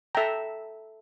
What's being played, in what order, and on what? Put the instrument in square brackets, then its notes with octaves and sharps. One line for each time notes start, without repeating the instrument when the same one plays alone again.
[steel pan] A4 E5 G5 A#5